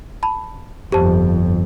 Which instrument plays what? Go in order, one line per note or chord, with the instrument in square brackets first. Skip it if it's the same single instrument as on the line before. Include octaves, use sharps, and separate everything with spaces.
[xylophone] A5 B5
[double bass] G1 F2 [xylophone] G4 C5 A5